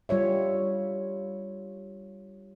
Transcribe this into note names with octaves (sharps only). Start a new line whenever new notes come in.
G3 F4 C#5 E5